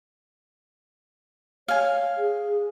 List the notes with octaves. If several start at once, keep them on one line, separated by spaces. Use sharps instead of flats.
C#5 F5 G#5
G#4